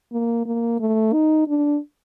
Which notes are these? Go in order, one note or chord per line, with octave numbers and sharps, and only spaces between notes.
A#3
A#3
A3
D#4
D4